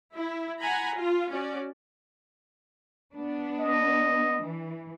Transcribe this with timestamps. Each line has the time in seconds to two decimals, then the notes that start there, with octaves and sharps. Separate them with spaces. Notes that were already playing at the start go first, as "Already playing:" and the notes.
0.15 E4
0.60 F#5 G#5 A#5 B5
0.95 F4
1.31 C#4 F#4 D5
3.14 B3 D4
3.60 D#5
4.44 E3